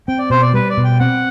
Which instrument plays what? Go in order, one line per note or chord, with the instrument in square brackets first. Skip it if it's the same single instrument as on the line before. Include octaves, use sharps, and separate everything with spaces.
[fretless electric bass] C4 [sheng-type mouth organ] G5
[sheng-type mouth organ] D5
[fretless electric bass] B2 [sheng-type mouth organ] C5
[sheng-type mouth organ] D5
[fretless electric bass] G3 [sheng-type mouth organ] B4
[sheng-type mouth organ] D5
[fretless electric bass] B2
[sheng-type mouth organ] G5
[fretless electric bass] C4 [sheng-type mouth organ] F#5